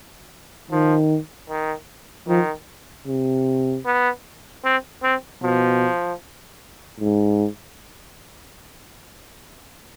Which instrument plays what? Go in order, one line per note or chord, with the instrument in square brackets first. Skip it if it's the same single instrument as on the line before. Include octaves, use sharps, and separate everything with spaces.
[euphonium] D#3 [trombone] F3
[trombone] D#3
[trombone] D#3 [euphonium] F3
[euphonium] C3
[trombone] B3
C4
C4
[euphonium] B2 [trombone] F3
[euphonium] G#2